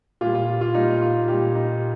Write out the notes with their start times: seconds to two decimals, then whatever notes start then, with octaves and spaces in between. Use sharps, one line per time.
0.21 A#2 G3 F4
0.35 F4
0.61 F4
0.74 A#2 G3 D#4
1.02 F4
1.28 A#2 G3 G4
1.55 D#4